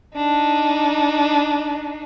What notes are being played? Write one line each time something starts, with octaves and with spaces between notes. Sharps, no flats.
D4 D#4